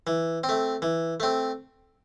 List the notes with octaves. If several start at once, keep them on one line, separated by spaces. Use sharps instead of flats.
E3
C4
A3
E3
A3 C4